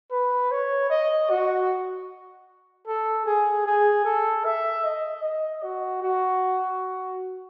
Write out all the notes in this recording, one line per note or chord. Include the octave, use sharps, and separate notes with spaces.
B4
C#5
D#5
F#4
A4
G#4
G#4
A4
E5
D#5
D#5
F#4
F#4